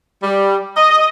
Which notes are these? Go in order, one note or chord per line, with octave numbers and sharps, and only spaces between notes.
G3
D#5